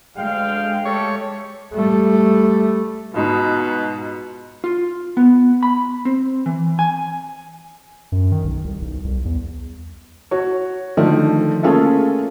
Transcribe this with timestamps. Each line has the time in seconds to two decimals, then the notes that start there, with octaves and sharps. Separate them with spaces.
0.17 D2 G#3 F5 G5
0.85 A3 G4 A4 C#5
1.73 G3 A3
3.14 G#2 B2 D#4 F4
4.64 F4
5.17 B3
5.63 B5
6.05 C4
6.46 E3
6.79 G#5
8.12 F#2
8.32 D#3
8.44 B1
8.64 C2
8.82 B1
9.04 C2
9.25 E2
10.31 F#4 C#5
10.97 D3 D#3 F3 A3
11.63 A3 A#3 C#4 F4 G#4 A4